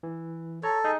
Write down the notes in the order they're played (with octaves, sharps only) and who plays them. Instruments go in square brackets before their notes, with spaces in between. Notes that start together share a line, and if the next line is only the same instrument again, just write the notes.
[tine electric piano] E3
[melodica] A4 [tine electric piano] C#5 A#5
[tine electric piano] D#4 G#4 D#5